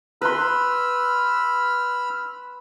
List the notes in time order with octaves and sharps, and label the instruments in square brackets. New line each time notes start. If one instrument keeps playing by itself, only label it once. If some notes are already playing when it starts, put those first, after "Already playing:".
[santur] B4 C6 [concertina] B5 E6 F6